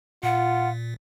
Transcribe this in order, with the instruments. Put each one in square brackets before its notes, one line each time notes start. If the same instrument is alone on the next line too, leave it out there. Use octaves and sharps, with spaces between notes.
[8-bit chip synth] A#2 [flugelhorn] F4 [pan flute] F#5